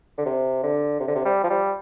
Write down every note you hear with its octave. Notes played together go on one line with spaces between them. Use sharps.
D3
C3
D3
C3
D3
C3
G3
F3
G3